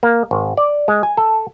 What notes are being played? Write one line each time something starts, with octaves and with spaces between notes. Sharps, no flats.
A#3
G#1
D5
G#3
G#5
A4